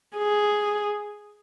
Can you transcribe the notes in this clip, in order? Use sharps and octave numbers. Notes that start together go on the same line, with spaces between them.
G#4